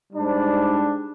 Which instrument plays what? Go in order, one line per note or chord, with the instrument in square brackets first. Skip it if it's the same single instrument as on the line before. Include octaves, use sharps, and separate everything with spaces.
[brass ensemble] G#2 G3 D4